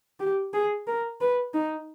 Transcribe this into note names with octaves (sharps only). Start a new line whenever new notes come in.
G4
G#4
A#4
B4
D#4